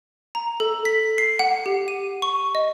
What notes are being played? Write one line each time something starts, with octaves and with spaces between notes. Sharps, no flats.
A#5
A4
B6
C7
F#5
G4
D#7
C#6
D#5